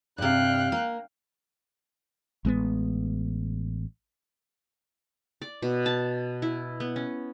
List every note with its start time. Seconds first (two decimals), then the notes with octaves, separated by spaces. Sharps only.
0.18 G2 C3 F5 G5 F#6
0.72 A#3
2.45 A1 G#3 A#3 B3
5.42 D5
5.62 B2
5.86 A5
6.42 E4
6.80 B3
6.96 C#4